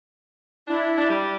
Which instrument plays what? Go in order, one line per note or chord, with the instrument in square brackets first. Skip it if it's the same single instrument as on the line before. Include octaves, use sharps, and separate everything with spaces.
[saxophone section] D4 [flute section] E4
[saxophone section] D4
G3